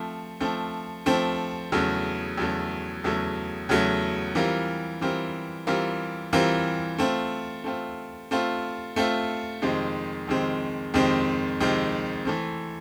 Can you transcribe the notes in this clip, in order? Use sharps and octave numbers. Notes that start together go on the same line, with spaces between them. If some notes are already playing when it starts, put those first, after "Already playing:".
Already playing: F3 A3 C4
F3 A3 C4
F3 A3 C4
E2 C#3 F#3 A3
E2 C#3 F#3 A3
E2 C#3 F#3 A3
E2 C#3 F#3 A3
E3 G3 C4 F4 A#4
E3 G3 C4 F4 A#4
E3 G3 C4 F4 A#4
E3 G3 C4 F4 A#4
A3 C4 F4
A3 C4 F4
A3 C4 F4
A3 C4 F4
F2 C3 D#3 G#3 C4
F2 C3 D#3 G#3 C4
F2 C3 D#3 G#3 C4
F2 C3 D#3 G#3 C4
E3 A3 C4